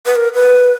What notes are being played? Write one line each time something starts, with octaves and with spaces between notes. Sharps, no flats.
B4
A#4
B4